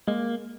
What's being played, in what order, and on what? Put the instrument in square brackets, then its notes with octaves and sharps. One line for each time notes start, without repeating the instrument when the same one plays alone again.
[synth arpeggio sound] G#3 [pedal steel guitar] A#3